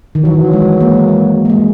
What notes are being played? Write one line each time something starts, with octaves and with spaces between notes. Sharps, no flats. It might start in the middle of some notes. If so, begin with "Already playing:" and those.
D#3
E3 F#3
G#3
A#3
G#3
A#3
G#3